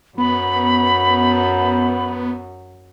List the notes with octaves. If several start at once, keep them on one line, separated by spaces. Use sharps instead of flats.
F#2 B3 B5